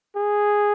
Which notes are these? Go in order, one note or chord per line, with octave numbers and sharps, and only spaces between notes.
G#4